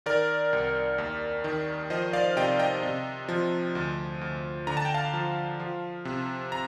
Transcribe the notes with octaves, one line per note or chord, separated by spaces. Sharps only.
D#3 A#4 D5
C2
D#2
D#3
F3 C5 D#5
D5 F5
C3 D#5 G5
D#5 G5
C3
F3
D2
D2
D3 A#5
A5
G5
F5 A5
F3
F3
C3
A#5